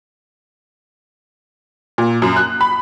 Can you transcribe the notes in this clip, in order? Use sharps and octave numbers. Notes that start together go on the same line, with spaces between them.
A#2
F#2
F#6
B5